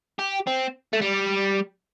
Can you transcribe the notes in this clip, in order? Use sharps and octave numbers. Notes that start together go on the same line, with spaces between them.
G4
C4
A3
G3